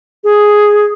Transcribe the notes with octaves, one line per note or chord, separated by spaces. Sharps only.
G#4